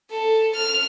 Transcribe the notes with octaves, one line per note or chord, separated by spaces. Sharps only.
A4
F6